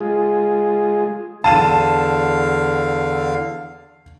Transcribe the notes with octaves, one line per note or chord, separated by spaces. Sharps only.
G#3 F4 G#4
E2 D3 F5 A5 D#7 E7